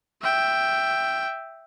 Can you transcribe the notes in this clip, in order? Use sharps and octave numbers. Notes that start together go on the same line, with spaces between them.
E5 G5